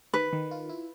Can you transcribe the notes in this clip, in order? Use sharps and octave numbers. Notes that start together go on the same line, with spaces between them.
D#3 B4
D#3
F4
E4